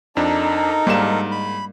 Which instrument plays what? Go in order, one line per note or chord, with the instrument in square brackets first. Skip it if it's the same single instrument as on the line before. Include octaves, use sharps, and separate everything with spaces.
[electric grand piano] F2 D4 [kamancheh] D#4 [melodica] A4 A#4
[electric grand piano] G#2 E7 [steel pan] G3 A#3
[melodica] B5